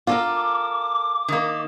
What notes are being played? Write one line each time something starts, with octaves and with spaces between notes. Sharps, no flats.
F4 A4 A#4 D6
D#3 A#3